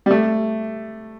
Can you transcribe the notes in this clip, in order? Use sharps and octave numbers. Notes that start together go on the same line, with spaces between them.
G3
A3